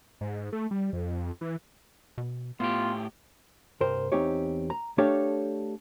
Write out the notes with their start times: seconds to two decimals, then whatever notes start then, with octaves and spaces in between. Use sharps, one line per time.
0.21 G#2
0.52 A3
0.71 G3
0.93 F2
1.41 E3
2.18 B2
2.60 A2 B3 F4 G4
3.81 C2 G2 A#4 C5
4.12 E2 C4 D#4 G4 C#5
4.70 A#5
4.98 A3 D4 G4 A4 C#5 F5